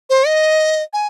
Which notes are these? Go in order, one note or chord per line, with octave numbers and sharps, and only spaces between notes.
C5
D#5
G#5